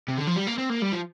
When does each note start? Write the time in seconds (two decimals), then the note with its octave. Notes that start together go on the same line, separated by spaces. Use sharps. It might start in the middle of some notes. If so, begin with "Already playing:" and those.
0.08 C3
0.18 D3
0.27 F3
0.36 G3
0.47 A#3
0.58 C4
0.70 A#3
0.82 G3
0.92 F3